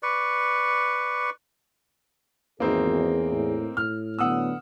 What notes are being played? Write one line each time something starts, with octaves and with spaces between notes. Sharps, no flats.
B4 D5 C#6
G#1 E2 A#3 C4 D#4 G#4
A2
A2 F6
D3 F#3 B3 F#5 D#6 E6